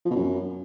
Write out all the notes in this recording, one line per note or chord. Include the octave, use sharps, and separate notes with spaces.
F3
B2
F#2